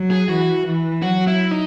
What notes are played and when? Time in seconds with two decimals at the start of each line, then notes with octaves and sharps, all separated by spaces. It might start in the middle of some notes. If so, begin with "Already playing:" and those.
Already playing: F#3
0.11 G#4
0.29 E3 F#4
0.66 E3
1.02 F#3 F#4
1.27 E4
1.51 D#4